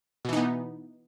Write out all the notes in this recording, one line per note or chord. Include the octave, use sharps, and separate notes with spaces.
B2 E3 B3 D#4